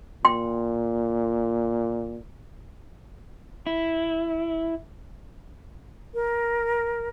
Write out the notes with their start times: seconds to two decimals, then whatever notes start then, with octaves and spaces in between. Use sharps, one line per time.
0.25 A#2 G5 C6
3.66 E4
6.14 A#4